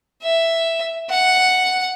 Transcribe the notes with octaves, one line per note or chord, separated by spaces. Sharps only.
E5
F#5